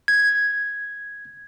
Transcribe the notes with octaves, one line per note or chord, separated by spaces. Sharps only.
G#6